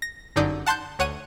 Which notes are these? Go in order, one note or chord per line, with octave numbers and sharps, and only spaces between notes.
A#6
G1 F#2 D3 D#4 D5 G6
F#5 A5 C6 F#6 G6
D2 C#5 F#5 C#6 D#7